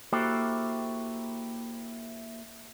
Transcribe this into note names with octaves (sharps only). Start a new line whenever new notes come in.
A#3 E4 F#4 G4 A4 C5